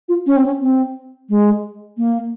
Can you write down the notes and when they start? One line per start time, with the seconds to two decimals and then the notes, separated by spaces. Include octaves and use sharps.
0.09 F4
0.27 C#4
0.37 C4
0.46 C#4
0.61 C4
1.30 G#3
1.97 A#3